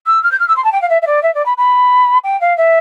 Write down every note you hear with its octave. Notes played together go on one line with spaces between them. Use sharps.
E6
F6
G6
F6
E6
C6
A5
G5
F5
E5
E5
D5
E5
D5
B5
B5
G5
F5
E5